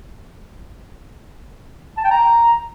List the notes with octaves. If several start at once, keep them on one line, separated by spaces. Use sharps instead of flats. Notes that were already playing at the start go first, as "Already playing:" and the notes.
A5
G5
A#5